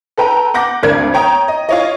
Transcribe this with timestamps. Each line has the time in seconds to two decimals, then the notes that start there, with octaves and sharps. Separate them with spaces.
0.18 A4 B4 G5 A#5
0.54 F#5 D6 G6 A#6
0.83 G#1 D2 A#4 D5 G#6
1.14 C#5 G5 A#5 D#6
1.48 D#5
1.69 F4 C#5 D#5